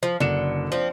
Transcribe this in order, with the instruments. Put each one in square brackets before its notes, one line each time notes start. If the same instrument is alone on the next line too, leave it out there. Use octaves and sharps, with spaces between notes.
[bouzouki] F3
[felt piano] F#1 C#7 E7 [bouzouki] D3
[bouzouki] F3 C4 [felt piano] C5 D5